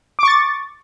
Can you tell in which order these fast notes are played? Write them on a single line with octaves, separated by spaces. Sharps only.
D6 C#6 A6